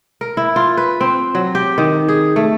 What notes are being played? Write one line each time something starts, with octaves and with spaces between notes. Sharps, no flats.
A#4
E4
F4
B4
C4
F#3
G4
D#3
G#4
A3